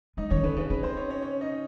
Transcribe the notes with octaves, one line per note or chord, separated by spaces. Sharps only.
G#3 D#4 D#5
D#3 C#4 C#5
D3 B4
C#3 B4
C#3 B4
C4 C5
C#4 C#5
C#4 C#5
C#4 C#5
D#4 D#5